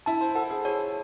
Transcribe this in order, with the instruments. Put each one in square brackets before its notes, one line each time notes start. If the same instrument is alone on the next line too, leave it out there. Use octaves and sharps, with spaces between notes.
[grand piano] E4 [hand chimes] A5
[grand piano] C5
[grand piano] A4 [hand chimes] F#5
[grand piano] G#4
[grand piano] G#4 [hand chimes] C#5